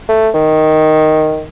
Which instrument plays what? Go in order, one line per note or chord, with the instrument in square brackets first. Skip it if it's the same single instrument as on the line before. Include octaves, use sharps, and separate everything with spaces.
[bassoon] A3
D#3